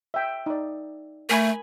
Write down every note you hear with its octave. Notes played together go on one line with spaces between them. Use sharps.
E5 G5
D#4 D5
A3 A#4 G#5 B5